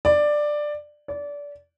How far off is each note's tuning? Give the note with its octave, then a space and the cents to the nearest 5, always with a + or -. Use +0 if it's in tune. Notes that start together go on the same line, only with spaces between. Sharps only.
D5 +10
D5 -25